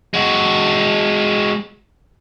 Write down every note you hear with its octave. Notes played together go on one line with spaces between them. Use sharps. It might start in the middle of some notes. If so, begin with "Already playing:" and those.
G#3 F#4